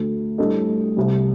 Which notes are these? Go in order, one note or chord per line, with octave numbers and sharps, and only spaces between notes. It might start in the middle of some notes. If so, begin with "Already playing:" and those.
Already playing: D2 D3 A3
A2 G3 D4 A4 D#5
C2 C3 G3